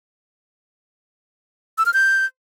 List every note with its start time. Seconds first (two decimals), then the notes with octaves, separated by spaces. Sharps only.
1.78 E6
1.86 F6
1.94 G6